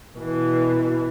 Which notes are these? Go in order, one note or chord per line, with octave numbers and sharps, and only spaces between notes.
B2 E3